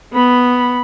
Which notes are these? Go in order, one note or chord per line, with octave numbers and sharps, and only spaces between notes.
B3 B5